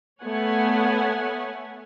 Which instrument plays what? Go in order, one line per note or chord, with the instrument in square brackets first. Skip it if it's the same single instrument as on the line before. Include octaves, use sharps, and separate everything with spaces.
[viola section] A3 B3 C#5 F#5 G#5